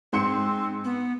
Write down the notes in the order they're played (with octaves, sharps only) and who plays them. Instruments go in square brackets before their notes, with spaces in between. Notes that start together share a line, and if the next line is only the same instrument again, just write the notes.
[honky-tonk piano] G#2 C6 C#7 [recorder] C4
[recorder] B3